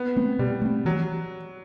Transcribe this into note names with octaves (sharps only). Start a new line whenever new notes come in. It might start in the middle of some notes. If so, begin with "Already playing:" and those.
Already playing: B3
A3 C4
B2 G3
A3 C4
E3 F#3